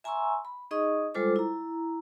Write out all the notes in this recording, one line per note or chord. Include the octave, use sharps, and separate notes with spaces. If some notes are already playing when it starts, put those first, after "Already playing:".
E5 G#5 A#5 C6 C#6 E6
B5
D#4 G#4 D#5 C#6 D#6
G3 G#3 F4 A4 C5 D6
E4 A#5